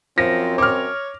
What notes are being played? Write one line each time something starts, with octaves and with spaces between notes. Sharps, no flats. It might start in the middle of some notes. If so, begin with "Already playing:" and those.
F#2 F3 C4 A#6
C#5 D6 F6